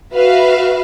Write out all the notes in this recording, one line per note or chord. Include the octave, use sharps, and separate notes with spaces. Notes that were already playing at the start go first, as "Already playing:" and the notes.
F#4 B4 E5 F5